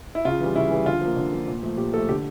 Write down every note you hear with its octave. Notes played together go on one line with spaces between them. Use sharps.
E4
C#3 F4
E3 G3
C#3 E4
E3 G3
D3 F4
F3 A#3
D3
F3 A#3
A#2
F3 A3
A#2 G4
F3 A3 A4
D3 G4